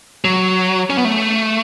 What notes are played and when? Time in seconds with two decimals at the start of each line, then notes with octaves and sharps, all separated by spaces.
0.24 F#3
0.90 C#4
0.98 B3
1.05 A3